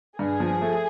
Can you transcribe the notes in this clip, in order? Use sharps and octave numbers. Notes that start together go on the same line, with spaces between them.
G2 G#4
F3
A3